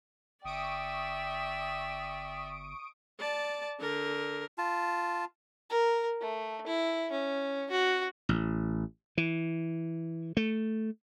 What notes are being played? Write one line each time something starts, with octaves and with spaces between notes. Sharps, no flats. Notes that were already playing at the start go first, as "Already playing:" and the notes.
G1 D5 E5 G5 C#6 D#6 D7
D5 A5
D3 A#4
F4 A5
A#4
A3
E4
C#4
F#4
A1
E3
A3